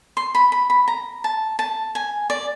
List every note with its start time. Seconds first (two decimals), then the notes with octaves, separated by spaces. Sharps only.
0.17 C6
0.35 B5
0.52 B5
0.70 B5
0.88 A#5
1.24 A5
1.59 A5
1.95 G#5
2.30 D5